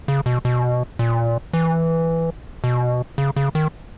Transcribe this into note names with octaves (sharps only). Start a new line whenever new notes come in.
C#3
B2
B2
A#2
E3
B2
C#3
C#3
D#3